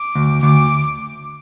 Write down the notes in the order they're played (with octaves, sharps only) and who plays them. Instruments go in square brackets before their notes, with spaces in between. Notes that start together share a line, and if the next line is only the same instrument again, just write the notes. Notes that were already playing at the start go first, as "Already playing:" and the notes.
Already playing: [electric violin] D6
[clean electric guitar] D2
[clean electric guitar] D2 [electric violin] D6